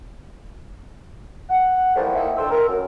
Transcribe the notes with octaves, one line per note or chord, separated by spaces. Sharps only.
F#5
E3 F3 G3 A3 A#3 C4
A#3 D#4 E4 E5 F#5 G5
F2 D3 C5 G5 E6
A#4
F#2